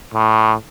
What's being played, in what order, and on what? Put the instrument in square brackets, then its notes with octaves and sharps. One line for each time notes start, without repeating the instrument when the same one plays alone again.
[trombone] A2